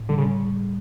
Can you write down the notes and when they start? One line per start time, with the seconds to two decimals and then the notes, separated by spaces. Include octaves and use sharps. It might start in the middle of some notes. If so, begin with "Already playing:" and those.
Already playing: A2
0.09 D3 G3
0.18 C#3